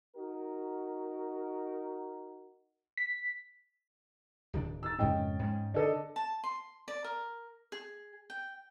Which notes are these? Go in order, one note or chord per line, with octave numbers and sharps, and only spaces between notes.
D#4 F#4 A#4
B6
D1 D#3 D4
E6 A6
F2 G#2 C#3 C#4 D#5 G5
G#2 G#3
D3 D4 A4 D#5
A5
C6
D5
A#4
G#4
G5